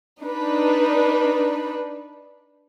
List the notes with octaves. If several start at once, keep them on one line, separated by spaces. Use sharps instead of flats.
D4 D#4 B4